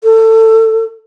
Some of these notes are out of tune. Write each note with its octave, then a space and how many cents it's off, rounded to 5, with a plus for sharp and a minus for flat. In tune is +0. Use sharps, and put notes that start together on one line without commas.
A4 +25